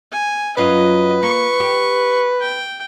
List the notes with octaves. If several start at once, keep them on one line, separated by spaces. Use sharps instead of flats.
G#5
F#2 F#3 F4 B4 D#5
A#3 C#6
G4
G5